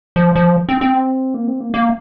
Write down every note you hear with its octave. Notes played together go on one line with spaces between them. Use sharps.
F3
F3
C4
C4
A#3
C4
A#3
A#3